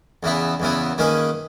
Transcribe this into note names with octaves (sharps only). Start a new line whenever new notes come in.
E2 C#3 E3 B3 E4
E2 C#3 E3 B3 E4
D#3 A#3 C#4 G#4 B4